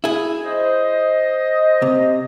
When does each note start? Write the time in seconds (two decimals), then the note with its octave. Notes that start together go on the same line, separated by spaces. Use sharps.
0.04 E4 G#4
0.45 C5 D#5
1.82 C3